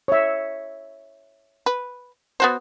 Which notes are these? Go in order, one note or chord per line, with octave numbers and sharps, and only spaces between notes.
C#5 E5
B4
B3 F#4 C5